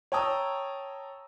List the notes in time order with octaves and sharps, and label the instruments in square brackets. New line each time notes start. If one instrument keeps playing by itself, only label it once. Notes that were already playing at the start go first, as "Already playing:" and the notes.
[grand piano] C#5 G5 A5 A#5 D#6 E6